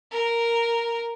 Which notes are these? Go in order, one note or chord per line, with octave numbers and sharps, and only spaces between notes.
A#4